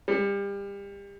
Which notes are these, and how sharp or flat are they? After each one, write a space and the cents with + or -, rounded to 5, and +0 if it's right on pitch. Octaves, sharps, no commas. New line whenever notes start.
G3 +30